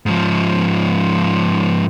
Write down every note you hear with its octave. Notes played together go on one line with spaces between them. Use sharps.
G#2 F3